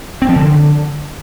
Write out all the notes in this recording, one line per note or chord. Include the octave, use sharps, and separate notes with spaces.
C4
F3
D3